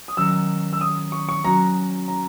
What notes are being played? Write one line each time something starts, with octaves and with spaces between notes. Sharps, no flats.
D#6
D#3 F#3 C#4 E6
E6
D#6
C#6
C#6
F#3 C#4 F#4 A#5
A#5